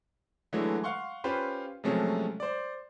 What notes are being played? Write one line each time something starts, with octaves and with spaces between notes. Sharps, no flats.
D3 E3 F#3 G#3 A3
F5 F#5 C6 C#6
C#4 F4 G4 B4 C5
C3 F3 F#3 G#3 A3 C#4
C5 D5